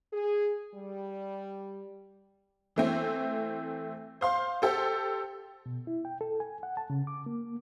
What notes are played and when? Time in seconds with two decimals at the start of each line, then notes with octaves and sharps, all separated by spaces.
0.13 G#4
0.75 G3
2.76 E3 A3 C4
4.21 C5 F5 C6
4.62 G4 A4 C5
5.66 B2
5.87 E4
6.05 G5
6.21 A4
6.40 G#5
6.63 F#5
6.77 A5
6.90 C#3
7.07 D6
7.26 A#3